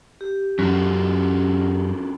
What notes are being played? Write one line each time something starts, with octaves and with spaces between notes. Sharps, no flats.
G4
F#2 C#4 F4 F#4